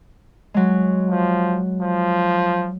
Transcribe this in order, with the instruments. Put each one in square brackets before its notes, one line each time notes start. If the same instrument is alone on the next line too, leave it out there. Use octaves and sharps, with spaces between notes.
[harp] F#3 G#3
[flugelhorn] F3
F3